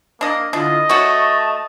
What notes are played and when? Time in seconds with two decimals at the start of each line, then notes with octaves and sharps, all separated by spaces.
0.21 A#3 D4 D#5
0.53 D3 D4 E4 F4 D#5
0.89 A3 F#4 C#5 A5